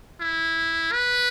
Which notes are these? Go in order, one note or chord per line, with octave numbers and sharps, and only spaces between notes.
E4
B4